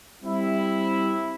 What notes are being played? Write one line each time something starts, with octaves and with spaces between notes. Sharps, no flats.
G3 C4 E4